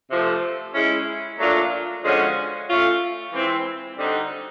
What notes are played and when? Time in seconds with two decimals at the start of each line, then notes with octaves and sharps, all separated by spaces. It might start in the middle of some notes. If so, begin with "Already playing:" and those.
0.10 C3 F3 A3
0.75 G#3 C#4 E4
1.39 A#2 F#3 A3 D4 F4
2.03 D3 F3 G#3 C#4 F#4
2.68 A3 C#4 F4
3.32 E3 G#3 C4 E4
3.96 D3 G3 C4 D#4 F#4